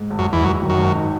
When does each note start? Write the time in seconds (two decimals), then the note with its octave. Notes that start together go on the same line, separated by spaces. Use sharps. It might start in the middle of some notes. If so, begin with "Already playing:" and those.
Already playing: G#2
0.10 G#1
0.19 F#2
0.27 G#1
0.33 E2
0.44 F#2 F#3
0.62 D#3
0.70 F#2
0.78 G#1
0.95 D#4